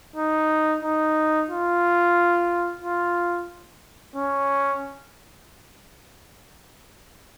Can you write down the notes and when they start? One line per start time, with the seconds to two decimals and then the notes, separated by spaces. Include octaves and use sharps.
0.16 D#4
0.83 D#4
1.50 F4
2.82 F4
4.16 C#4